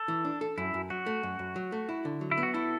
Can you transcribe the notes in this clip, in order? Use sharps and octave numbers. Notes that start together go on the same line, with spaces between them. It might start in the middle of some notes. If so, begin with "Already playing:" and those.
Already playing: A4
E3
D4
A4
F#2 E4
F#2
F#3 F#4
A3
F#2
F#2
F#3
A3
E4
D3
F#3
E4
B3
F#4
E4 A4